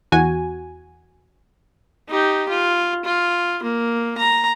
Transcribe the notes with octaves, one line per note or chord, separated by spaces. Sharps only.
E2 F#4 G#5
D#4 G4
F4
F4
A#3
A#5